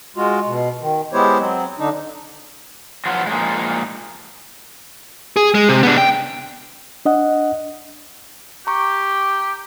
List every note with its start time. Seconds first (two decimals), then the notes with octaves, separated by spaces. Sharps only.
0.17 G#3 F4 F#4
0.47 B2
0.81 D#3
1.13 G#3 B3 E4 G4 C5 C#5
1.39 F#3 C4
1.79 D3 D4 D#4
3.06 F3 F#3 B3 F4
3.27 A#2 F3 G#3
5.37 G#4
5.55 G#3
5.69 C3
5.83 B3 D4
5.98 G5
7.05 D4 D#5 F#5
8.67 G4 A#5 C#6